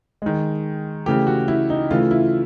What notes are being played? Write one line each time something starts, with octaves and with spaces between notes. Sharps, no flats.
D#3 G#3
C#3 E3 A3 G4
F#4
E4
D#4
C#3 E3 A3 F4
E4